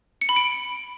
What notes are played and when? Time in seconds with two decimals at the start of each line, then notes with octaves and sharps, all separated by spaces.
0.21 C#7
0.29 B5
0.36 D7